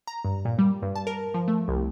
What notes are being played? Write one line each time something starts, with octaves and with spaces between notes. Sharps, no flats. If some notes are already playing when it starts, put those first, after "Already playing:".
A#5
G2
A#2
G3
G2
A5
A#4
F3
A3
C2